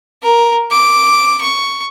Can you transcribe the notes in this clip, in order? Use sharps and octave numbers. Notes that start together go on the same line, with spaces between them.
A#4
D6
C#6